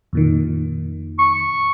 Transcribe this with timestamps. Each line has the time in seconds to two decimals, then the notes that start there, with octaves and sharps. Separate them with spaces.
0.13 F2 A#2 D#3
1.19 C#6